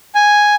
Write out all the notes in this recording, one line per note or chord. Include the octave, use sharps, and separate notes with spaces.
G#5